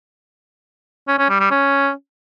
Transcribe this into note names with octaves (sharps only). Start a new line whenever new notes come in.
C#4
C#4
G3
G3
C#4